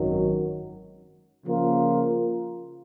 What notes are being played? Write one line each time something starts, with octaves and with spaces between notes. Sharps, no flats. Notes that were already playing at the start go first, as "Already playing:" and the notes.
Already playing: G#1 F#2 D#3 F#3
C#3 F3 A#3 F4 A#4